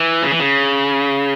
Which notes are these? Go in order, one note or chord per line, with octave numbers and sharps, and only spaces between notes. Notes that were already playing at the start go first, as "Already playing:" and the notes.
Already playing: E3
C#3
E3
C#3